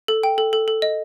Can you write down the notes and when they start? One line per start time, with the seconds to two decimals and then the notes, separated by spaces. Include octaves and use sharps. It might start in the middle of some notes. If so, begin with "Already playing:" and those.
0.08 A4
0.23 G5
0.38 A4
0.53 A4
0.68 A4
0.82 D#5